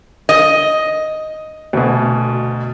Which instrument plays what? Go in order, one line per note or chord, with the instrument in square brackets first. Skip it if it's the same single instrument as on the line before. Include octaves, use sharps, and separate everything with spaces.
[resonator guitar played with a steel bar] D#5
[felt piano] D2 B2